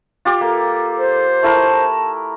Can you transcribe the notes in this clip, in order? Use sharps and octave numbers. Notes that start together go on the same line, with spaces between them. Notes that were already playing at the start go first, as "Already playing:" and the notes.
F4 G4 D6
A#3 A4
C5
A3 E4 A#4 A5